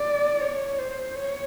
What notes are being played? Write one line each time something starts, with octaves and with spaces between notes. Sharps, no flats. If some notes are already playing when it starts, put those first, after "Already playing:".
Already playing: D5
C#5
C5
C#5